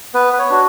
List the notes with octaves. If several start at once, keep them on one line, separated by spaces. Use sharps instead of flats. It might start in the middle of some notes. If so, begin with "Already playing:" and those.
B3 B4
B4
C#5
D4 F#4